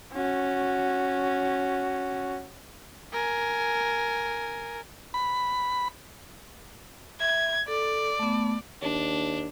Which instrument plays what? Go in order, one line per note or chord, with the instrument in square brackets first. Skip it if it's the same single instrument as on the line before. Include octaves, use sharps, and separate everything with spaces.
[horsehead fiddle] C#4 F#4
[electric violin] A#4 G#5
[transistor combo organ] B5
[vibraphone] E5 [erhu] G#6
[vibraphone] A4 [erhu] D5
[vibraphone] A3 B3
[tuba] D#2 [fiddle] D4